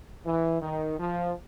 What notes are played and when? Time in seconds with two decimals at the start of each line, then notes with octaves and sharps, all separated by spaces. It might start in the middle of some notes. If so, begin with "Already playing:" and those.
0.25 E3
0.61 D#3
0.98 F3